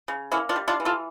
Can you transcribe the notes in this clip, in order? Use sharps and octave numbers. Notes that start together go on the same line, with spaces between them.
C#3
A#3 C#4 E4
D4 F4
G3
D4 F4
E3
F4 A4